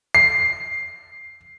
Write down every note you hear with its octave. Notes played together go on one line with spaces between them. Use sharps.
C7